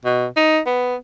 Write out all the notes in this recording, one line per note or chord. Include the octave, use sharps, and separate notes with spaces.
B2
D#4
B3